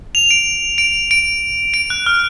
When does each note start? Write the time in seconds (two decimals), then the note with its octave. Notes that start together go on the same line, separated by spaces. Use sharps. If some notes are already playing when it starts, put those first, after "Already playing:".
0.15 F7
0.31 D7
0.78 D7
1.11 D7
1.74 D7
1.90 F#6
2.06 F6